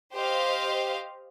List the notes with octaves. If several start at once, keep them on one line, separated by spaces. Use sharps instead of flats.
G4 C5 D#5 F5